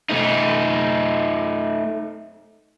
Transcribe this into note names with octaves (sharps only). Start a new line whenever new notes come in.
A3 D#4